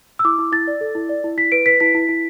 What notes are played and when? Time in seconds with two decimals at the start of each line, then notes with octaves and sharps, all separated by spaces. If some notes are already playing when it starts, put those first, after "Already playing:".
0.19 E6
0.25 E4 D6
0.39 E4
0.52 E4 A6
0.68 D5
0.81 A4
0.95 E4
1.09 D5
1.24 E4
1.37 E4 B6
1.52 B4 D7
1.66 B4 B6
1.80 E4 B6
1.95 E4
2.09 E4